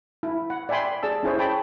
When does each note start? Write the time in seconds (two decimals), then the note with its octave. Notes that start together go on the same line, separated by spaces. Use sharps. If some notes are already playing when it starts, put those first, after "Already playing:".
0.23 E4
0.50 F#5
0.69 D5 E5 G5 G#5 B5 C6
1.03 G#4 D5 A5 E6
1.23 C#4 E4 G#4 C5 C#5
1.38 C#5 G5 A5 B5